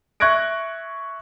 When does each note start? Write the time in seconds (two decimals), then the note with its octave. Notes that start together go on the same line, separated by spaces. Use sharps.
0.20 E5 C#6 F#6 G#6 A#6 D7